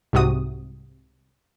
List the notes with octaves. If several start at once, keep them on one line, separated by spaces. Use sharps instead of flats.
C2 G#2 C3 F#4 D#6